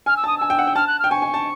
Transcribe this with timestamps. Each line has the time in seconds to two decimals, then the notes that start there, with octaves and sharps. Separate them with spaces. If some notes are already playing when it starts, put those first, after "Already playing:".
0.06 G#5 F6
0.16 E6
0.24 A5 D#6
0.38 G#5 E6
0.50 G5
0.59 F#5
0.67 G5
0.76 A5 F6
0.87 F#6
0.99 G5 F6
1.11 G#5 C#6
1.22 G#5
1.34 A5